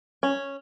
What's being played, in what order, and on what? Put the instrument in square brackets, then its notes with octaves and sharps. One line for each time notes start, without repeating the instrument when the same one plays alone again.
[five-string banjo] C#4